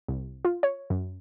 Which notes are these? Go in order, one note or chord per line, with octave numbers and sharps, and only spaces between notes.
C2
F4
C#5
F#2